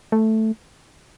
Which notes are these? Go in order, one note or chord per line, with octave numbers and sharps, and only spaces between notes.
A3